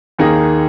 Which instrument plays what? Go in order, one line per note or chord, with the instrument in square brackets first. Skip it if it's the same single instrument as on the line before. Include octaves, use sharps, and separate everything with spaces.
[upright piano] D#2 D#3 A#3 D#4 G#4